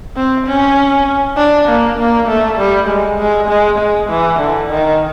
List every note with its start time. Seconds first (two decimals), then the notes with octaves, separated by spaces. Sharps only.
0.16 C4
0.47 C#4
1.37 D4
1.68 A#3
1.98 A#3
2.29 A3
2.58 G3
2.89 G#3
3.19 G#3
3.49 G#3
3.79 G#3
4.10 E3
4.39 D3
4.70 D#3